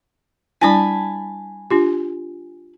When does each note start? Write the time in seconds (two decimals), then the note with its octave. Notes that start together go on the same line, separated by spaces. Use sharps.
0.61 G3 D4 E4 G#5 A5 B5
1.71 D4 F4 G4